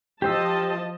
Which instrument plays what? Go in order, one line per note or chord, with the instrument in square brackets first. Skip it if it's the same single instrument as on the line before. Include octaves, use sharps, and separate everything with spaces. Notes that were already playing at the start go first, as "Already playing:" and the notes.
[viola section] F3 D#5 A5 [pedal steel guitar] G4 C5 E6